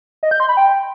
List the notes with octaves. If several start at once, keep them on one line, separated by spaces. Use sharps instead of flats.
D#5
G6
C6
B5
G5